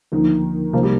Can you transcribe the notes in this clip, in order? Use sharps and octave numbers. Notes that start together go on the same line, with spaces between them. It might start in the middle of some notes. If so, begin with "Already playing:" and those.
D2 D3 D#3 F3 A#3
C2 C3 D#3 F3 A#3
G3